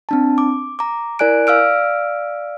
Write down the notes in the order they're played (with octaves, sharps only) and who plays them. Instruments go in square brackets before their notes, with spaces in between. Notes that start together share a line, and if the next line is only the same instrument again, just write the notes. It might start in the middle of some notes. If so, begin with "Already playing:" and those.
[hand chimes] C4 D4 A5
D6
A#5 D6
E4 A#4 D5 G#5 F#6 D7
D5 F5 E6 F6 D7